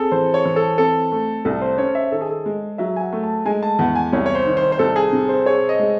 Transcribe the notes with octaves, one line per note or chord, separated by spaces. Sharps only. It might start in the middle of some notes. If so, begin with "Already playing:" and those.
Already playing: C4 G#4 A4
E3 C5
C#5
E3
A4
C4 A4
A3
C2 A4
C5
C#4 C#5
E5
D#3 A4
G#4
A4
G#3
F#3 E5
G#5
F#5
A3
A5
G#3 G#5
A5
E2 F#5
G#5
C2 C#5
C#5
C5
D#3
C5
C5
C2 A4
G#4
C3
C5
G#4 C#5
D#5
G#3